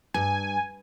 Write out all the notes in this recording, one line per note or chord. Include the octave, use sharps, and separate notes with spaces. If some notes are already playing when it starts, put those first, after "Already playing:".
G2 G#5